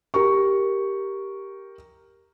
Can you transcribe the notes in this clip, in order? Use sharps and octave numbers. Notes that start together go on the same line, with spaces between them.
G4 A#4 C#6